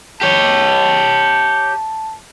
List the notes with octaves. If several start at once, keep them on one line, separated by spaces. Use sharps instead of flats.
G4 C#5 A5